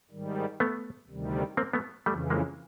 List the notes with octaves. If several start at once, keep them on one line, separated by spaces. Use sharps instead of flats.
G#2 D#3 G3
A3 B3
D2 C3 D#3 G3
A#3 C4
A3 B3
F2 C#3 E3 G3 A3
G#3 A#3